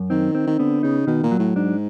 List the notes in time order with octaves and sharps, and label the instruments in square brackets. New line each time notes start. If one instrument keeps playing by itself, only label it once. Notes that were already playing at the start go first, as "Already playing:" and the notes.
Already playing: [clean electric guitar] F#2
[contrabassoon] D#3 [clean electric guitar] C4
[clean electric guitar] C4
[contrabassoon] D#3
[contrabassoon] D3 [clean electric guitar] B3
[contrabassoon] C#3 [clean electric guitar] D#4
[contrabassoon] B2 [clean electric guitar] D#3
[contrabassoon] A#2
[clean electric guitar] F#3
[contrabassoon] A2
[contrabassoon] G#2 [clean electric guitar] D4